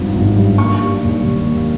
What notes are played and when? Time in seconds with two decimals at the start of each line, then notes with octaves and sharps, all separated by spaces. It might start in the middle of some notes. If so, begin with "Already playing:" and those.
Already playing: G#1 G2 F3
0.15 G#1
0.36 G2
0.58 A#3 C#6
0.80 G3
1.03 D#2
1.23 D#3
1.46 A#3